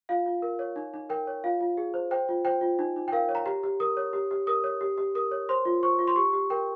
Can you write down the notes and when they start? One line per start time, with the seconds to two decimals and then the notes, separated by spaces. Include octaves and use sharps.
0.09 F4 F5
0.26 F4
0.42 A#4
0.59 C#5
0.76 D#4
0.94 D#4
1.09 A#4 G5
1.27 C#5
1.44 F4 F5
1.61 F4
1.77 G#4
1.94 C5
2.11 C5 G5
2.29 F4
2.45 C5 G5
2.61 F4
2.79 D#4
2.96 D#4
3.08 G5
3.12 A#4 F5
3.29 C#5
3.35 A#5
3.46 G4 A#5
3.63 G4
3.80 A#4 D#6
3.97 C#5
4.13 G4
4.31 G4
4.47 A#4 D#6
4.64 C#5
4.81 G4
4.98 G4
5.15 A#4 D#6
5.31 C#5
5.49 C5 C6
5.65 F4
5.83 C5 C#6
5.99 F4
6.07 C6
6.16 G4 C#6
6.33 G4
6.50 A#4 G5